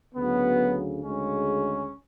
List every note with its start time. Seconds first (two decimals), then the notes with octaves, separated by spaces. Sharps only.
0.13 D2 C#3 F#3 B3
1.03 D2 C#3 G#3 C#4